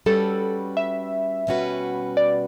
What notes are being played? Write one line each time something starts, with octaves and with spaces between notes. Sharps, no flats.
G3 C#4 F#4 A4 B4
E5
B2 G3 C#4 F#4 B4
D5